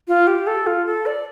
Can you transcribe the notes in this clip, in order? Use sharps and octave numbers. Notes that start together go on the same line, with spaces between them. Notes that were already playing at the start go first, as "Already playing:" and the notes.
F4
G4
A4
F4
A4
D5